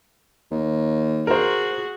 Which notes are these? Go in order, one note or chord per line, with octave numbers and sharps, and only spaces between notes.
D#2
F#4 G#4 A#4 C5